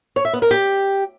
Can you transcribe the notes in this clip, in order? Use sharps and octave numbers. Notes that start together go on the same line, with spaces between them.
C#5
E5
B3
A#4
G4